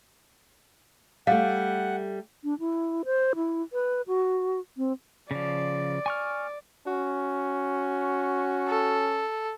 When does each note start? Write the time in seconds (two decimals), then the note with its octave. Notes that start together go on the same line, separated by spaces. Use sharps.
1.27 G3 A3 F5 F#5
2.44 D4
2.60 E4
3.05 C5
3.36 E4
3.73 B4
4.08 F#4
4.77 C4
5.31 C#3 F3 D5
6.06 G#5 C#6 F6
6.87 C#4 F#4
8.68 A4